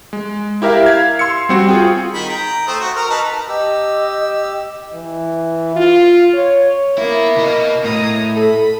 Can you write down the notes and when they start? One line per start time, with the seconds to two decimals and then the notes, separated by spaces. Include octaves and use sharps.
0.13 G#3
0.62 E4 G4 A#4 E5 F5
0.86 F5 G#6
1.19 C6 E6 C#7
1.49 G3 C4 F#4
1.69 F4 G#4 G5
2.13 D#3 B5
2.29 G5 A#5
2.67 A3 C5 D#6
2.80 F#4
2.96 A#4
3.10 D#4 B4 A5
3.49 G4 D#5 E6
4.93 E3
5.76 F4
6.34 C#5
6.98 A#3 B3 E4
7.37 B2 D#5
7.84 A2 A#5 D#6
8.36 A4 B5